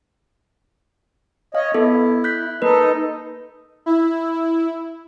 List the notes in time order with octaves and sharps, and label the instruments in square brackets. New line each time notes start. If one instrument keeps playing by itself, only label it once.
[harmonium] C#5 D#5 [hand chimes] F5
[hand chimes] B3 A4 D#5 [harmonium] E4
[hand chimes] F#6 G6 B6
[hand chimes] A#3 B4 [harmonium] D#4 A4 D#5
[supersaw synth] E4